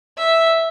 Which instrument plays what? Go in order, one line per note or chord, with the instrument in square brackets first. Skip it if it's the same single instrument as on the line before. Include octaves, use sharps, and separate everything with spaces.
[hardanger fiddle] E5